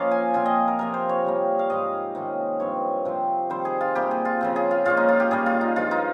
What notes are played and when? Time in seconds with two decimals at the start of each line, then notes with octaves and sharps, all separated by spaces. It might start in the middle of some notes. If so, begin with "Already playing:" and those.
Already playing: F3 A#3 C#4 D#5 F5
0.11 G#5
0.34 A#2 F3 C4 G#5
0.46 D#5
0.68 A#4
0.79 C3 F3 A#3 A#4
0.94 C5
1.09 C#5
1.25 C3 G3 A#3
1.59 F5
1.70 G#2 F3 C4 D#5
2.15 C3 D#3 A#3 C#4
2.60 G2 F3 C4 C#5
3.05 C3 F3 C4
3.50 D#3 G3 C4 C5
3.65 G#4
3.81 F4
3.95 C3 G3 A#3 G4
4.11 G#4
4.25 F4
4.41 C#3 F3 C4
4.56 G#4
4.71 F4
4.85 A#2 G#3 C#4 F4
4.97 D#4
5.08 F4
5.20 G4
5.31 A#2 G3 A#3 C#4 G#4
5.46 F4
5.61 D#4
5.76 G2 F3 G#3 F4
5.91 D#4